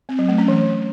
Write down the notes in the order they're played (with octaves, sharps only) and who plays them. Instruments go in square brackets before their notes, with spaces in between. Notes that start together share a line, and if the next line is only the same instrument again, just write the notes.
[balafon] C4
F#3
A3
C#4
E3